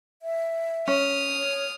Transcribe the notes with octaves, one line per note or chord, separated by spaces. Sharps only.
E5
C#4 D#6 F6
C#5